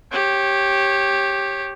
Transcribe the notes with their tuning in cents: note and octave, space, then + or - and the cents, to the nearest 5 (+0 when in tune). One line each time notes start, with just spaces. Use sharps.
G4 +0 C#5 -20